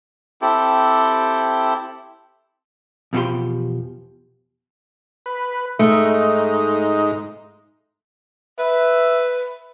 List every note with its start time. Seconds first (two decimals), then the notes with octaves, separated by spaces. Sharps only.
0.41 C4 E4 G4 A4
3.13 E2 B2 F3 F#4 G4 C6
5.26 B4
5.79 G#2 A3 D#4
8.59 B4 E5